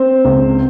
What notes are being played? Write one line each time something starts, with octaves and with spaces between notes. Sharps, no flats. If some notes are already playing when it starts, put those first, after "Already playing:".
Already playing: C4 C5
C#2